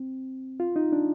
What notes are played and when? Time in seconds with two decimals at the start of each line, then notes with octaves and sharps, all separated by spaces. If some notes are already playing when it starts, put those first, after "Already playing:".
Already playing: C4
0.60 F4
0.76 D#4
0.92 D4